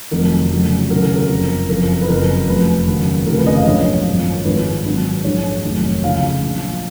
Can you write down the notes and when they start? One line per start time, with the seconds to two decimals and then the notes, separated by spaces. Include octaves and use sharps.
0.11 F1 F2 D#3 F#3 A#4
0.51 F1 F2 C#3 F#3
0.90 D#2 C#3 F#3 A#4
1.03 A#4
1.16 A#4
1.30 F#1 F2 F3
1.69 F#1 F2 F3 A#4
2.02 B4
2.08 F#1 F2 C#3 F#3 A#4
2.48 F1 F2 F3 B4
2.87 D#2 C#3 F#3
3.26 F1 D#2 C#3 F3 A#4
3.37 B4
3.46 D#5
3.56 F5
3.66 A#1 G#2 F#3 C#5
4.05 G#1 F#2 F3
4.45 G#1 G#2 F3 B4
4.85 G#1 G#2 F#3
5.24 A#1 G#2 F#3 C#5
5.64 F1 D#2 D#3 F#3
6.03 C#2 C#3 F3 F5
6.42 A#1 A#2 F#3